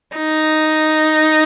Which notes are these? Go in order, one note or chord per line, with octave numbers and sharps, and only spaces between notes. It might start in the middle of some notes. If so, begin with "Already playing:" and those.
D#4